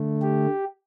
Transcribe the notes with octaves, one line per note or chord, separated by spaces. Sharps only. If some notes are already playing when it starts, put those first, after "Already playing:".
Already playing: D3 A3
G4